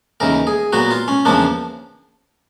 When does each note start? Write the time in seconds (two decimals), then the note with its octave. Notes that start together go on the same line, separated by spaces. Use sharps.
0.20 D#2 C#3 E3 A#4
0.47 G#4
0.73 A#2 F#3 B3 F#4
0.91 F4
1.08 C#4
1.25 E2 C#3 F3 A#3 D4